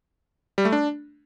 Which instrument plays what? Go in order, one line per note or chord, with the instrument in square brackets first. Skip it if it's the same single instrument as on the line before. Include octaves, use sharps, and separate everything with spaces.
[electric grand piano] G3
A3
D4